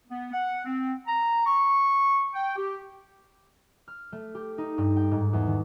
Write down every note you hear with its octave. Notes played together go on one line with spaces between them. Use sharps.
B3
F#5
C4
A#5
C#6
G5
G4
F6
A3
G4
D#4
G2
G5
G#2
E2
D#3